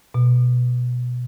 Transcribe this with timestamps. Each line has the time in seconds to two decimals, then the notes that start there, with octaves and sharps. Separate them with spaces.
0.14 B2